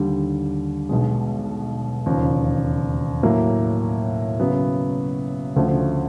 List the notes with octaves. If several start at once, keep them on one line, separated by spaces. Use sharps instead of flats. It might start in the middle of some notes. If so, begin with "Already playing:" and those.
Already playing: D#2 D3 G3
B1 B2 G#3
E1 D#2 C#3 F3
A2 F#3 A#3
C#3 F#3 B3
D2 C#3 F3 A3